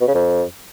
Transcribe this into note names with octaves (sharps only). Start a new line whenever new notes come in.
B2
C#3
F2